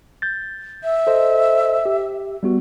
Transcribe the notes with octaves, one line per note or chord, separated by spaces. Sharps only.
G6 A6
E5
A4 C5 D#5
G4
G3 B3 F#4